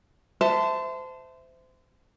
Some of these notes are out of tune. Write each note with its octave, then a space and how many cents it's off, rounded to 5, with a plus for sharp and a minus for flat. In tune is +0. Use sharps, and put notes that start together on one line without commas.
C5 -25 E5 +0 A5 +0